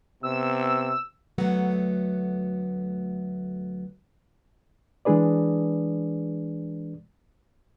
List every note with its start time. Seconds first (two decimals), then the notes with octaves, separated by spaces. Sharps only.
0.23 C3 B3 E6
1.38 D2 F#3 A3 B3 F#5
5.05 E3 G#3 D4 G#4 B4 D5